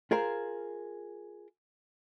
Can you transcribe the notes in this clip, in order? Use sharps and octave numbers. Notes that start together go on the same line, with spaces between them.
F4 G#4 A#4 C5